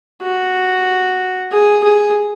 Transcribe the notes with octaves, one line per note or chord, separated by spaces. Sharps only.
F#4
G#4
G#4